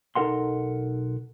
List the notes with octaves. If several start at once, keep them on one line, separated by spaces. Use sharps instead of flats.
B1 D#4 A4 A#4 F#5 C6